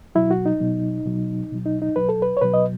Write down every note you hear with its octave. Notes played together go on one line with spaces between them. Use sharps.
B2 F#3 E4
F#4
D#4
B2 F#3
B2 F#3
B2 F#3
D#4
D#4
B2 F#3 B4
A4
B4
C#5
B2 F#3 B4
D#5